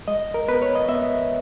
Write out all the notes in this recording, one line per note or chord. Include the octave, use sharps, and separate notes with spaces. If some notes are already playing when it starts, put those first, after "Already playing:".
G#3 D#5
A#4
B3 B4
C#5
D#5
B3 E5